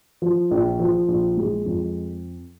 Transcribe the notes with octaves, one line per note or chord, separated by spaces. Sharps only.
F3
A#1
F3
A#1
G#3
F2